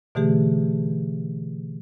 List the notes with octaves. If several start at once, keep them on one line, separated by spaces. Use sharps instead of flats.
B2 D3 E3 A3 G4 G#4